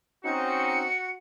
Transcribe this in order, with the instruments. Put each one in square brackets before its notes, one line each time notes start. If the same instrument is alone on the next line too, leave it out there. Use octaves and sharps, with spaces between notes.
[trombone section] C4 C#4 D#4 [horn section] F#4 [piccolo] C#7